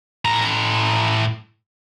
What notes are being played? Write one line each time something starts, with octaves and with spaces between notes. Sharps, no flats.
A2 A#5